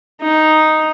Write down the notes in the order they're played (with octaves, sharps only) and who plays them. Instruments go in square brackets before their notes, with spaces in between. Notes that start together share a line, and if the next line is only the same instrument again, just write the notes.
[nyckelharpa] D#4